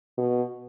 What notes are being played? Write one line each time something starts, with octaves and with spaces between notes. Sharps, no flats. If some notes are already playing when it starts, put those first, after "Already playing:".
B2